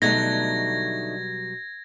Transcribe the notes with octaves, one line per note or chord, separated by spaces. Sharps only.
B2 D3 F#3 G3 A3 D#4 G#6 A#6